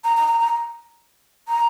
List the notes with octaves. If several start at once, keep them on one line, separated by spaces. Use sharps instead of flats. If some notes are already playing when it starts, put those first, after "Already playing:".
A#5
A#5
A#5
A#5
A#5